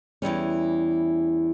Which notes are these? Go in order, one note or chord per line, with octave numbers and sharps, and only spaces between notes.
E2 E3 G3 C#4